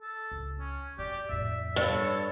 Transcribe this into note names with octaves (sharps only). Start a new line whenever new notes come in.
A4
C#2
C#4
F#2 G4 D5
F2 A2 E5
G2 A4 C#5